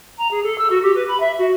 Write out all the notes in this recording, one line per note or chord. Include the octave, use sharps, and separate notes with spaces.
A#5
G#4
A4
E6
F#4
G4
B4
B5
E5
F#4